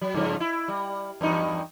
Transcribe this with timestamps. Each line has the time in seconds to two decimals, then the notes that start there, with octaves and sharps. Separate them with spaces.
0.01 F#3
0.14 G2 C#3 F3
0.40 E4
0.68 G3
1.21 E2 G2 D#4